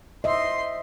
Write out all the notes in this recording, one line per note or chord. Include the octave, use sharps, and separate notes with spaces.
C5 D#5 E5 C6